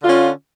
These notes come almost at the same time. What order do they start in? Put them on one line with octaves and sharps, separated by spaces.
D3 F4 C#4